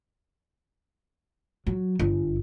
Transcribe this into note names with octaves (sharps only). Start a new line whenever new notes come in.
F#3
G1